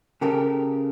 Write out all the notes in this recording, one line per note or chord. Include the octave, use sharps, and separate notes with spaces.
C#3 G4 A4 A#4